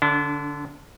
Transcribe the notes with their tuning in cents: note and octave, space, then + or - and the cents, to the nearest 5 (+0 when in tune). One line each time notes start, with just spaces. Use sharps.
D3 +0 D4 -40